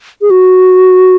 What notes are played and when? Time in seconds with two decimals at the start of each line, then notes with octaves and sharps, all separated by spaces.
0.21 G#4
0.30 F#4